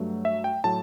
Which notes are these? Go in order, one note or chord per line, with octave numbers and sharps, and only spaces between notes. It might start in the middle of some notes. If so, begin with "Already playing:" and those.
Already playing: G2 F#3 A3
E5
G5
A2 F#3 A3 A5